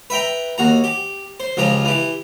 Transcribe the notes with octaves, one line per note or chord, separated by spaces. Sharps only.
B4 E5 G5 A#5
D#2 F#4 A#5
G4
C5
C#2 F3 G4 A#5
E3 G4